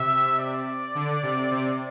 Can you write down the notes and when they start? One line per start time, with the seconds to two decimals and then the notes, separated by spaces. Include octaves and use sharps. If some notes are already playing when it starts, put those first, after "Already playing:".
Already playing: C3 E5
0.39 D5
0.95 D3
1.23 C3
1.51 C3